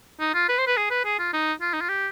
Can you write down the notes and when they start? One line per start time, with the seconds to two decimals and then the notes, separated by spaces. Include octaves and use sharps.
0.20 D#4
0.35 F4
0.49 B4
0.58 C5
0.67 B4
0.77 G#4
0.90 B4
1.05 G#4
1.19 F4
1.33 D#4
1.61 F4
1.73 D#4
1.81 F4
1.89 G4